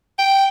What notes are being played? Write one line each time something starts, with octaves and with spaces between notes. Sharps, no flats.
G5